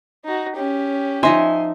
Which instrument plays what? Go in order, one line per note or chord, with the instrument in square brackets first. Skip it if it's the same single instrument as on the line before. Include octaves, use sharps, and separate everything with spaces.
[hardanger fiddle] D#4 F#4
C#4 G4
[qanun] F3 D#4 E5 [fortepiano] G#5 C6